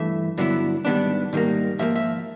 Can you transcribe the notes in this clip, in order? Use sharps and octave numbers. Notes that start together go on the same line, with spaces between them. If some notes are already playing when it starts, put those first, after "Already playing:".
Already playing: G2 E3 A3 E5
G2 D3 F#3 B3 E4
G#2 D#3 G3 B3 D4
G#2 D#3 G3 A#3
G#2 F3 A#3 E5
E5